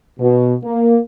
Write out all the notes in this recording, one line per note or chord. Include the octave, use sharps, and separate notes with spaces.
B2
A#3